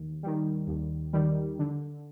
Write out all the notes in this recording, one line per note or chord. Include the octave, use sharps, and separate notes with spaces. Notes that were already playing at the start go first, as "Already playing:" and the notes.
Already playing: D#2
D#3 G3
D#2
D#3 G3
D3